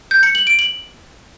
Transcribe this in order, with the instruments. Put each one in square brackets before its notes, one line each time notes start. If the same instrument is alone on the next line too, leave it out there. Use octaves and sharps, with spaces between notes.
[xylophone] G6
C#7
F#7
D7
F#7